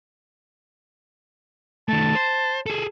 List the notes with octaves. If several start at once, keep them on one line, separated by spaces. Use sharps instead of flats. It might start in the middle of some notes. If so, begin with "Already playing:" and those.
D#3 A3 A5
C5
G#4 A4